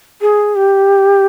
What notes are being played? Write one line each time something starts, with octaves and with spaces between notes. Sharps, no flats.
G#4
G4